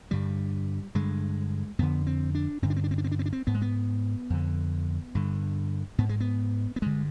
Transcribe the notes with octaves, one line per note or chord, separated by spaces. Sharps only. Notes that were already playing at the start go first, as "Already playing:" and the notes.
G2 D3 G3
G2 D3 G#3
F2 D3 B3
C4
D4
G2 D3 C4
D4
C4
D4
C4
D4
C4
D4
C4
D4
C4
G#2 B3
G#3
B3
F2 D3
G2 D3
G#2 B3
G#3
B3
B3
G2 D3 G#3